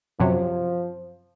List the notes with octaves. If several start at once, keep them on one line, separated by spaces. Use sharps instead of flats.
F#2 C3 F3 F#3